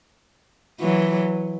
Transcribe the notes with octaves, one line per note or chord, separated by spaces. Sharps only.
E3 F#3